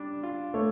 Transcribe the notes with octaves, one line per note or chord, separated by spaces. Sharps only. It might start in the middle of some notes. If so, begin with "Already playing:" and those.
Already playing: G3 D4
F4
A3 C#5